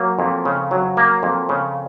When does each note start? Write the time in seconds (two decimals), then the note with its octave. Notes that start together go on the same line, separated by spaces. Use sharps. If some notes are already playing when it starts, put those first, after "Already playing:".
Already playing: F#3 A#3
0.19 F2
0.45 C#3
0.71 F#3
0.97 A#3
1.23 F2
1.49 C#3